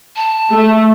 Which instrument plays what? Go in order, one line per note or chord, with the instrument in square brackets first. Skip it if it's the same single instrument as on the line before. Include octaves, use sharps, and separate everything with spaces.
[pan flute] A5
[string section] A3